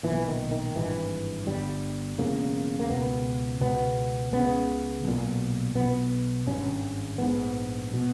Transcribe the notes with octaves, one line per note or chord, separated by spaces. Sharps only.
B1 A#2 E3
D#3
D#3
G#1 G2 E3
G1 G2 G3
E1 E2 C#3 A#3
A#3
C#2 B2 B3
C#2 B2 B3
C#2 C#3 B3
B1 A#2
B1 B2 B3
G#1 G2 C#4
A#1 G#2 B3
B2